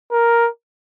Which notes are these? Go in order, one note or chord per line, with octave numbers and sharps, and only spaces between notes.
A#4